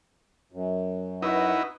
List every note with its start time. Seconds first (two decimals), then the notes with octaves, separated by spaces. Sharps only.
0.52 F#2
1.22 D#4 E4 F#4 B4